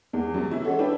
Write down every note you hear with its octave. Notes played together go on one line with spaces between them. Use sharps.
E2
F#2 C3
E3 E4
G#3 C#4 F#4 A4
C#4 D4 E4 B4 G5